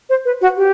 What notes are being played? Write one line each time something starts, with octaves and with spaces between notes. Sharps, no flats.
C5
B4
F#4
G4